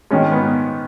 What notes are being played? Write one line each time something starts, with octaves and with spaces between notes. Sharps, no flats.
G#2 D#3 C#4
B3